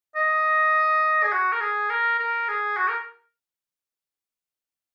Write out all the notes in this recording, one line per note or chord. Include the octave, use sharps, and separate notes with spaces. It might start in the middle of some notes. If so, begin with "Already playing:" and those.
D#5
G#4
F#4
A#4
G#4
A#4
A#4
G#4
F#4
A#4